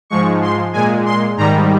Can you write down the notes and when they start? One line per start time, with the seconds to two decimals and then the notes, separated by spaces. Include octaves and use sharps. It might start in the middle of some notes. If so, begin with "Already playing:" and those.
0.10 G#2 F3 G#3 C#6
0.42 C6
0.73 A#2 G#3 G#5
1.06 C6
1.37 G#2 D#3 G3 A#5